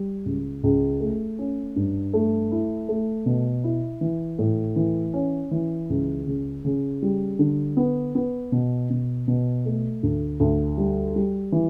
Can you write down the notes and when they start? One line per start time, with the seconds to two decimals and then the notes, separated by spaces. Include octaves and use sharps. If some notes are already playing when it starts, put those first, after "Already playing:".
Already playing: G3
0.25 C#2
0.63 C#2
1.00 A3
1.38 C#4
1.76 G2
2.13 A3
2.52 E4
2.89 A3
3.26 B2
3.64 E4
4.01 E3
4.39 A2
4.76 E3
5.13 C#4
5.51 E3
5.90 C#2
6.27 C#3
6.65 C#3
7.02 G3
7.39 D3
7.77 B3
8.15 B3
8.52 B2
8.90 B2
9.28 B2
9.65 A3
10.03 D2
10.40 D2
10.78 G3
11.16 G3
11.52 E3